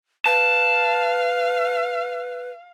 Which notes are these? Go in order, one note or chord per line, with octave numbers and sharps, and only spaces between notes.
B4 F5 A5